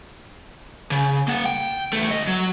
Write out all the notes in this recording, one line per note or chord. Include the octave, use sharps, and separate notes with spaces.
C#3
A#3 F#5
G5
E2 A3
D2 D#5
F#3